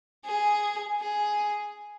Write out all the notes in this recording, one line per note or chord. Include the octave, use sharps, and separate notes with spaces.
G#4
G#4